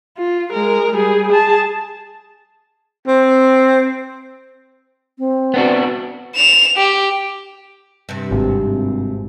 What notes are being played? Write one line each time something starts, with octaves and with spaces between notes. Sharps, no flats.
F4
G#3 A#4
G3 G#4
G#4 A5
C4
C4
B3 D4 F#4
E7 F7
G4
G2 C3
G#1